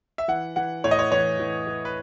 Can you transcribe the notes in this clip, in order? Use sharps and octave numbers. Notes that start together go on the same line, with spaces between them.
E5
E3 F#5
E3 F#5
A2 C#5
D#5
C#5
E3 C#5
E3
E3
B4